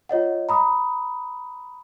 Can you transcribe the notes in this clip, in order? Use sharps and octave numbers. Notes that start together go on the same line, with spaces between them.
F4 C#5 D#5 F#5
A#5 B5 D#6